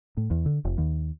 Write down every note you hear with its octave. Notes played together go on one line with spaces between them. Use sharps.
A2
E2
D3
F1
D#2